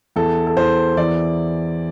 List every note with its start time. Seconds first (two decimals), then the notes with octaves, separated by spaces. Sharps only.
0.16 E2 A4
0.47 A4
0.57 E2 C5
0.97 E3 D5